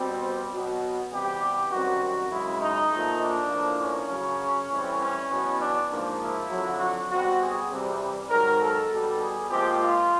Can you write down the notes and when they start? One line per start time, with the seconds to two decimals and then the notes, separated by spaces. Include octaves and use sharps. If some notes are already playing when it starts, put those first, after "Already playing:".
Already playing: B2 G3 C4
0.52 B2 F#3 B3
1.11 C3 E3 G3 B3 G4
1.71 F#2 D#3 G3 C4 F#4
2.31 F#2 C#3 E3 G#3 E4
2.61 D#4
2.91 A#2 F3 A3
3.21 D4
3.51 A2 F3 A#3
3.81 C#4
4.10 F#2 C#3 F#3
4.71 A2 E3 G3 C4
5.01 C#4
5.30 E2 B2 F#3 B3
5.60 D4
5.90 G#2 F3 A#3
6.21 E4
6.50 F2 D3 F#3
6.80 F#4
7.10 B2 G3 C4 F#4
7.40 G#4
7.70 C3 E3 G3
8.30 G#2 D#3 F#3 A#4
8.60 A4
8.90 B2 G3 B3
9.19 G#4
9.49 A#2 F3 G#3 C4 G4
9.80 F4